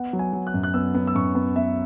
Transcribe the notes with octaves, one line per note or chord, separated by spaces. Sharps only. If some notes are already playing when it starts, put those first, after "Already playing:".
Already playing: B3 F#5
F#3
G#5
F#3
F#6
F#2
F#6
B3 E6
B3
E6
F#2 C#6
B3
B3 E5